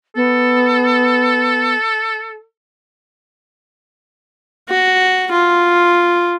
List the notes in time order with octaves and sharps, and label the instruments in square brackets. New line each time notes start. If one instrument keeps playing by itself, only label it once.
[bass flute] B3 [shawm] A4
[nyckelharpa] F#4
F4